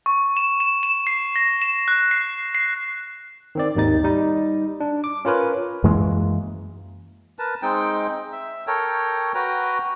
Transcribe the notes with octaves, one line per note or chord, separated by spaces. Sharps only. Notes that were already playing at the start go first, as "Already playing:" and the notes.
C#6
E7
E7
E7
C7
A#6
E7
F#6
C7
C7
D#3 C4 D5
G#1 D#2 D#3 D#4 A6
G3 D#4
D4
D6
C#4 F4 A#4 B4 C#5
F#2 E3 G#3 A#3
A#4 B4 A5
G#3 C4 D#4 G5
E5
A4 A#4 C#5 G5
F#4 B4 G5 A#5